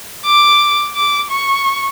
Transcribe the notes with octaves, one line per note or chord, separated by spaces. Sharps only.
D6
D6
C#6